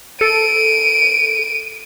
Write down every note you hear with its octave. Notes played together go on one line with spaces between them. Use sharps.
A4 D7 D#7